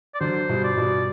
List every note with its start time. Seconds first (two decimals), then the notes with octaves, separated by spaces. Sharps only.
0.15 D5
0.20 D3 F#3 C5
0.49 G2 B2
0.64 D5
0.77 G2 B2